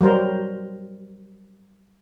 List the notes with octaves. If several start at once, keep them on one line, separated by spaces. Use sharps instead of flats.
F#3 G3 A#4 C5